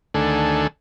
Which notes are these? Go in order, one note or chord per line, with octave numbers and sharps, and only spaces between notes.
D2 D#3 A3 D4 A4 G#5